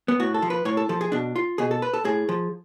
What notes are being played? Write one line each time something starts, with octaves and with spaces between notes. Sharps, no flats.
B3
A2 F#4
A4
F3
B4
A2 C#5
A4
F3 A4
G#4
B2 D4
F4
B2 G#4
A4
B4
A4
A2 G#4
F3